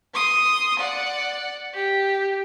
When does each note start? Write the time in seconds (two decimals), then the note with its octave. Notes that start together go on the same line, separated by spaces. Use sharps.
0.14 C6 D#6
0.79 D5 F#5
1.74 G4